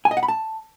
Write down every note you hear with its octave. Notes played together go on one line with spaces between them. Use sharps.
G#5
D#5
F#5
B5
A5